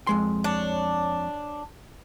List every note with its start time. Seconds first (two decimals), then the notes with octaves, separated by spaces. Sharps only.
0.07 F2 G#3 C6
0.44 D4 C#5